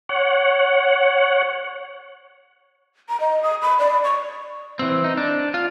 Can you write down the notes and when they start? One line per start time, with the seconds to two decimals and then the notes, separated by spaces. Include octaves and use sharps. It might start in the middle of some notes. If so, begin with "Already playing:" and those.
0.09 C#5 F#5
3.09 A#5
3.20 D#5
3.43 D#6
3.62 B5
3.79 D5
4.04 C#6
4.79 E3 C4
5.04 D#4
5.17 D4
5.54 F4